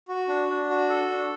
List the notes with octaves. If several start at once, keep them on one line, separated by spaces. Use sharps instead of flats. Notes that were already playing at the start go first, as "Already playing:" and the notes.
F#4
D4
D4
F#4
A4
D4